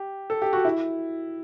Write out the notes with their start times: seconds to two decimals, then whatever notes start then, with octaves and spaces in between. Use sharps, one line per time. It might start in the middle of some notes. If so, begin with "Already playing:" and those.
Already playing: G4
0.30 A4
0.42 G4
0.53 F#4
0.65 E4